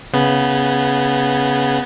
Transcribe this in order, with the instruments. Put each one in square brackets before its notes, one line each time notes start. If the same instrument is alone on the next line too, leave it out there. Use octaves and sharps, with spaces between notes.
[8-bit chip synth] C#3 B3